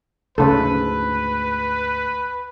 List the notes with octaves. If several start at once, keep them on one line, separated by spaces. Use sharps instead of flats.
D2 G#2 C#3 A4 B4